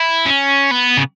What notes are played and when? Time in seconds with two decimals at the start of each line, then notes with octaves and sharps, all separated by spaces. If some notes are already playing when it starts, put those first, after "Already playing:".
Already playing: E4
0.26 C#4
0.71 B3
0.98 C#3